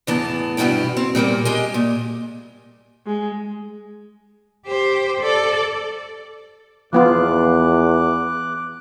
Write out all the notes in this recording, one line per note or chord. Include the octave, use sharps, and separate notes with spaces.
E2 A2 E3 B3 A5
G2 B2 F#3 B3 E4 G5
C4
A#2 G3 A3 A#3
G#3 G4 D#5 G#5
A#2
G#3
G4 C5
A4 D5
E2 F3 B3 F4 D6 F#6